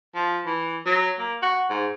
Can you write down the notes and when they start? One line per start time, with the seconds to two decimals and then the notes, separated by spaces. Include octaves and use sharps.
0.15 F3
0.46 E3
0.86 F#3
1.18 A#3
1.42 F#4
1.69 G#2